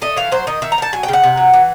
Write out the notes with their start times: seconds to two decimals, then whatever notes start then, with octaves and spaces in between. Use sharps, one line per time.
0.02 A3 D#5
0.16 E3 F5
0.32 F#3 C5
0.47 D#3 D#5
0.62 D#3 E5
0.72 A#5
0.78 D#3 A5
0.93 F#3 G#5
1.03 G5
1.08 C#3
1.13 F#5
1.23 C3
1.37 F#3
1.54 E3